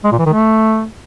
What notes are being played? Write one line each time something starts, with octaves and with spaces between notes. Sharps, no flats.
G#3
A#2
E3
D#3
A3